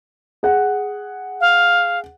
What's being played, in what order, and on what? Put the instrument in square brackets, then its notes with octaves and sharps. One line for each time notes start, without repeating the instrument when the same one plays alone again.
[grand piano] G#4 F#5
[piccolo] F5